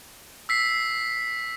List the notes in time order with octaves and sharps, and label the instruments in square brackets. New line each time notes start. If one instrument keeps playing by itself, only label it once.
[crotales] E6 B6 C7